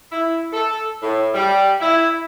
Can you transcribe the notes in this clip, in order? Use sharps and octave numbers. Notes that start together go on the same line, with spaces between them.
E4
A4
A2
G3
E4